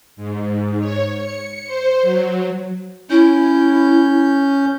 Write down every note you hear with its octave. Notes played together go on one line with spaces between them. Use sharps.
G#2
C#5
C#7
C5
F#3
C#4 E4 G6